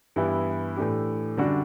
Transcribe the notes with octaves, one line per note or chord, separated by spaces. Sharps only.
G2 E3 B3 E4 G4
A2 E3 A3 D4 G4
F#2 D3 G3 D4 F#4